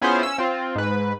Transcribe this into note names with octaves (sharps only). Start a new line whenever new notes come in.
B3 C#4 E4 F4 G#4 C5
C#4 E6
C4 F4
G#2 B4